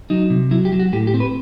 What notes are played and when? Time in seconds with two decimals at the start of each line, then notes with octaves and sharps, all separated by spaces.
0.10 F#3 D#4
0.30 C3
0.51 F#3 E4
0.65 G4
0.73 F#3
0.79 F#4
0.93 A2 G4
1.07 G4
1.14 C4
1.20 B4